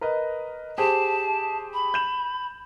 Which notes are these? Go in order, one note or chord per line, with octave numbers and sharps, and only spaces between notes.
A#4 B4 D#5
G4 G#4 C5 A5
B5
G6 E7